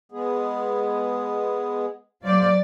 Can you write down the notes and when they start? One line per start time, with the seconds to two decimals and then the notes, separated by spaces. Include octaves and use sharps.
0.12 G#3 B3 G#4
2.23 G#2 F#3 C5 D5 F5